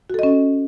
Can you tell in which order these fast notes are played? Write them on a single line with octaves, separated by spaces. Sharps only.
F#4 A4 D#5 C#4